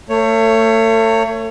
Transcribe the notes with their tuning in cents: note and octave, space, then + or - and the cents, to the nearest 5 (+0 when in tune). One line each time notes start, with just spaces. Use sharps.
A3 +35 C#5 +0